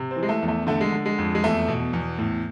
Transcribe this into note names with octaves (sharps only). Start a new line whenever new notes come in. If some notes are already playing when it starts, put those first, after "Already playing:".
Already playing: C3
C4
E3
G#3
A3
E2
A3
D3 A3
G#3
D3
G#3
F2
G#3
E2 A3
B2
E2
A2